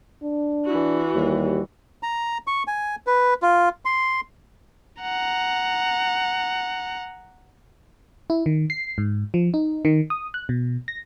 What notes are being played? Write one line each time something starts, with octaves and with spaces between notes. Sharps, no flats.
D4
E3 F#4
D#2 G3
A#5
C#6
G#5
B4
F4
C6
F#5 A#5
E4
D#3
C7
G#2
F3
D#4
D#3
D#6
F#6
B2
A#6